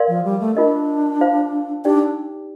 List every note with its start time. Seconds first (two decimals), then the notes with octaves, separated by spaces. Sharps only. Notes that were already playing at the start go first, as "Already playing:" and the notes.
Already playing: A#4 D5 F5 C6
0.08 F3
0.24 G3
0.40 A3
0.56 D4 F4 A#4 D#5
1.21 F4 C5 F5
1.85 D4 D#4 G4 D5 G5